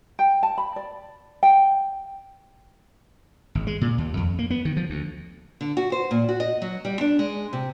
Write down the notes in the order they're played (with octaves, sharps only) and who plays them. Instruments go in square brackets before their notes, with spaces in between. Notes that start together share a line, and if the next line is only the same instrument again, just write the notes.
[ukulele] G5
A5
B5
D5
G5
[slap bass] G#1
G#3
A#2
D#2
F2
A#3
B3
D#3
F3
D2
[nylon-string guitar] D3
F#4
C5
A#2
F#4
D#5
F#3
G3
D4
G#3
C3